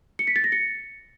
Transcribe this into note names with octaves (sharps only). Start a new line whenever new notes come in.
C#7
B6
A6
A#6
C#7